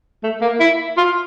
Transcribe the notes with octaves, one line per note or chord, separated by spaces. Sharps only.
A3
A#3
E4
F4